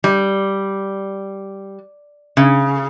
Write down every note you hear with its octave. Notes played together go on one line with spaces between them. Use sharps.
G3
C#3